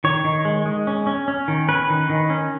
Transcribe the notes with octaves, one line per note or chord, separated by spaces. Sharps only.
D#3 C#5
D#3
G#3
G#3
C#4
C#4
C#4
D#3
C#4 B4
D#3
D#3
C#4